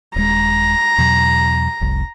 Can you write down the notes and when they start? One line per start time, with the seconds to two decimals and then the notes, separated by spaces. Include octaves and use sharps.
0.16 D#1 G#3 A#5
0.98 E2 B2 F#3
1.81 F1 C2